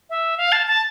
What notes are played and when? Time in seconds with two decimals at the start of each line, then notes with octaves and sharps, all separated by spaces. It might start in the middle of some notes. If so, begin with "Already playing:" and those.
0.10 E5
0.37 F5
0.52 A5
0.67 A5